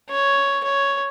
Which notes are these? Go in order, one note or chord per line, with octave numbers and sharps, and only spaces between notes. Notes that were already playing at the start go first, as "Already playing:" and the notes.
C#5
C#5